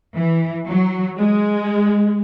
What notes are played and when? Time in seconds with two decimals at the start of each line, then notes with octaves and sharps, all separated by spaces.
0.16 E3
0.67 F#3
1.17 G#3